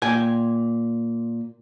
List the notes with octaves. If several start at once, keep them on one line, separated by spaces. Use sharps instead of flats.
A#2 G5 G#5